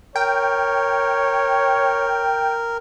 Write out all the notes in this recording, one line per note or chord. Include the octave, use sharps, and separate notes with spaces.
A#4 C#5 G5